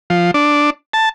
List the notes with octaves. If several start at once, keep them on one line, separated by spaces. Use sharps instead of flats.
F3
D4
A5